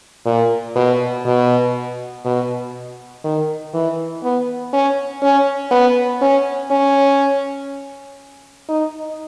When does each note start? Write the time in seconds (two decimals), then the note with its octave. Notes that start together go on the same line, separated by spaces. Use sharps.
0.26 A#2
0.76 B2
1.25 B2
2.25 B2
3.24 D#3
3.74 E3
4.23 B3
4.73 C#4
5.22 C#4
5.71 B3
6.22 C#4
6.71 C#4
8.69 D#4